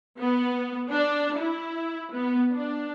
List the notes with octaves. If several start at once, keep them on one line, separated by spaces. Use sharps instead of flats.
B3
D4
E4
B3
D4